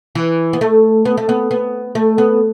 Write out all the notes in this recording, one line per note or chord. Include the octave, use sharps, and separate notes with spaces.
E3
B3
A3
B3
A3
B3
B3
A3
B3